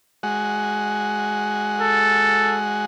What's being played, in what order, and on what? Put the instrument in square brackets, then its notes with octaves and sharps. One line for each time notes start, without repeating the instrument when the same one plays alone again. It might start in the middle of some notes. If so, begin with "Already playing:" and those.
[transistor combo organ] G#3 F#4
[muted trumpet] A4